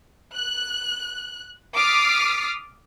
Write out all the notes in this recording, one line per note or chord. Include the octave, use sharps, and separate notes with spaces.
F#6
D6 D#6 F6 A6 B6 C7